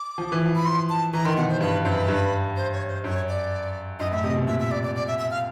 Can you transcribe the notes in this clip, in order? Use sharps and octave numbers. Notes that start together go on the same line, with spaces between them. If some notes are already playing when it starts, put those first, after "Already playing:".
Already playing: D6
F3
E3
F3
B5
C6
A5
E3 A#5
D#3 C6
B2 F#5
C5
G2 B4
F#2 B4 C5
G2
C5
C#5
C5
F#2 C#5
D5
F#2 D#5
A2 E5
C3 D#5
B2
A#2 E5
E5
D5
D5
D5
E5
E5
F5